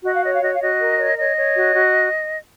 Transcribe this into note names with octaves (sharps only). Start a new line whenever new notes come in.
F#4 D#5
F5
C#5 D#5
F5
F#4 D#5
F5
F#4 D#5
A#4
C#5
C#5 D#5
C#5
F#4
F#4